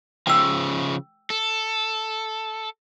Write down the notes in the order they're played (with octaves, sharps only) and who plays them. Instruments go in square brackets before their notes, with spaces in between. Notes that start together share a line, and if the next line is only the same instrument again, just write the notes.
[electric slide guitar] C#3 F3 [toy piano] G5 E6
[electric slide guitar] A4